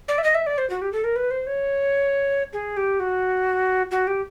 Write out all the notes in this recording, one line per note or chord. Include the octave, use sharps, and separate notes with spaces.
D5
E5
D#5
E5
D5
C5
F#4
G4
A4
A#4
B4
C5
C#5
G#4
G4
F#4
F#4
G4